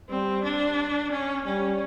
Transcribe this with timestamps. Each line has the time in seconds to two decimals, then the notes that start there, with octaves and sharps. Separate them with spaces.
0.09 G3 C4
0.44 D4
1.11 C#4
1.45 G3 C#4